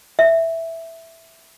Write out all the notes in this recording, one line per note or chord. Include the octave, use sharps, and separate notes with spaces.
E5